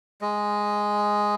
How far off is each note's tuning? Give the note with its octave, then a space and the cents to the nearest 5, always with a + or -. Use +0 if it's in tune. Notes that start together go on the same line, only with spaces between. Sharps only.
G#3 +0 D#5 +0